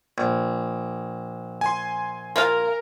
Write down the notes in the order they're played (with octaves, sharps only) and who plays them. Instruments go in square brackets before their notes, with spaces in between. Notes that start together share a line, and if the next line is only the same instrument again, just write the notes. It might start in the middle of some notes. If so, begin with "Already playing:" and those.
[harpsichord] A#1
[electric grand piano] G#5 C6
[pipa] A#3 F4 F5 [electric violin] A#4